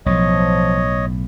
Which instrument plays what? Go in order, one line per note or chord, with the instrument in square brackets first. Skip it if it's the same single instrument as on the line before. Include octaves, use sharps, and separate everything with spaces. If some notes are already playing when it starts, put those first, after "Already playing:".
[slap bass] B1 A2 [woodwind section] F3 [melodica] C#5 D#5